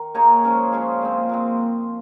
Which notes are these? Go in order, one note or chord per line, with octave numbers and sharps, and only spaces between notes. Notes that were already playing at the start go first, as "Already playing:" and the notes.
Already playing: D#3
A#3 D#4 G#4 C#5
F3 G#3 C#4 G#4
F3 G#3 C#4 G#4
A#2 G#3 C4
A#2 G#3 C4